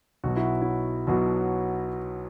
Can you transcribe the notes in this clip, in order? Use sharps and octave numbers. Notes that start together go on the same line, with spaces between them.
B1 B2 F#3 F#4
E4
E4
B1 B2 F#3